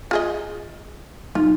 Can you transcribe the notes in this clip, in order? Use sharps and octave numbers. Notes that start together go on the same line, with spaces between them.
F4 G#4 D#5
B1 F4